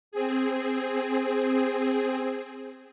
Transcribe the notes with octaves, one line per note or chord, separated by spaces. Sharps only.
C4 G#4